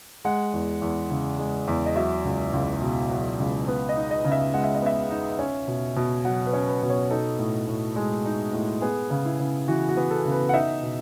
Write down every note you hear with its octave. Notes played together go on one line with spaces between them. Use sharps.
G#3 F#5
E2
E2
C#3
G#3
E2
D#5
F#3 E5
C#2
C#2
B2
F#3
C#2
B3 B4
D#5
D#4
D#5
C#3
E5
G#3 F#5
E5
D#5
B3 E5
D#4
C#4
B2
B2
F#3 F#5
B4
C#4
B4
B2
C#5
D#4 A4
A2
A2
G#3
D#4
A2
B3 G#4
C#3
E4
C#3
E3 F#4
F#4
B3
A4
C#3
B4
F#5
D#4 E5
B2